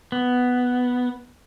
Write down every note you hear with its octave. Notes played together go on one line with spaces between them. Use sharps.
B3